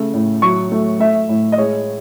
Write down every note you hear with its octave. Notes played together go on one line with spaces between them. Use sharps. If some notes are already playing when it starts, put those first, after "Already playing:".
Already playing: C#3 A3
A2
F#3 C#6
A3
A3 E5
A2
D#5
G#3 C#5